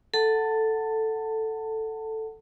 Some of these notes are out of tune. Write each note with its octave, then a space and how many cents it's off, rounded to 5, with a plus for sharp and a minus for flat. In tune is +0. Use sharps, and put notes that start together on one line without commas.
A4 +0 F#5 +0 A5 +25